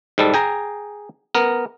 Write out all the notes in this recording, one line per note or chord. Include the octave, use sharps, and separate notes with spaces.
G#2 G3 A4
G#4 G5 A#5
B3 A#4